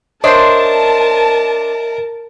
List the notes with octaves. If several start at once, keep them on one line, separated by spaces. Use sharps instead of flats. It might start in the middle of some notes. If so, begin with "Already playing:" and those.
D4 A#4 C5 C#5 D#5 E5 A5 C6